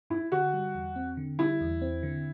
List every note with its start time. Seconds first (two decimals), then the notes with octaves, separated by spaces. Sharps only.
0.10 G2 E4
0.32 D3 F#4
0.54 G3
0.75 E2
0.96 C4
1.17 D3
1.39 G3 E4
1.61 E2
1.81 C4
2.03 D3